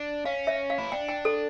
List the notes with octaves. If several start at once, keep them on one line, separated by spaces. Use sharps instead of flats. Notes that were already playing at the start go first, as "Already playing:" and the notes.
Already playing: D4
C#4 F5
E5
F5
E4
D4 G5
G5
A4